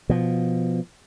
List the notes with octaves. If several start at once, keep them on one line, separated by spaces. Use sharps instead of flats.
B2 F3